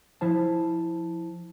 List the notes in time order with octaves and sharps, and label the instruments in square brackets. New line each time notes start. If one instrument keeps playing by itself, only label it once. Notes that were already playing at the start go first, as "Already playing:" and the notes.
[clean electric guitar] F3 E4 C5 A5